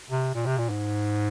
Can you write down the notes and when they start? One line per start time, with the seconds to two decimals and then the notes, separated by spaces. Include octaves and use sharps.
0.10 C3
0.35 A#2
0.46 C3
0.58 A#2
0.70 G#2